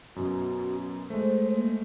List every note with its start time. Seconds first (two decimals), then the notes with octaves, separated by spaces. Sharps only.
0.16 F#2 B2 F#4
1.10 G#3 A3 C5
1.54 A#3